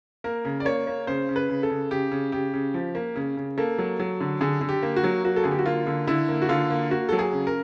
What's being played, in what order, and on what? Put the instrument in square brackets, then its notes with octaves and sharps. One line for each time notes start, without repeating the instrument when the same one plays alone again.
[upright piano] A#3 A#4
C#3
D5
A#3 C#5
A#3
C#3 C5
C#3
B4
C#3
A4
C#3
C#3 G4
C#3
C#3 G4
C#3
F3
A#3
C#3
C#3
A#3 A4
F#3
F#3
D3
D3 G#4
D3
G4
A#3
F#4
F#3
A#3 F#4
A4
D3 G#4
G4
F#4
A#3 F4
D3
D3 E4
A#3
F#4
D3 F4
A#3
A#3 F#4
F#3 A4
G#4
C#3
A#4